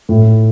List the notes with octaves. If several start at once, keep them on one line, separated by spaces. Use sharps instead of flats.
A2